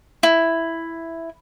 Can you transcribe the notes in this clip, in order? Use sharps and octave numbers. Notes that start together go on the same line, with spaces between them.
E4